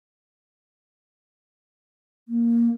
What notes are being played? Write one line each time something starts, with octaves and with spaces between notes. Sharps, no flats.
A#3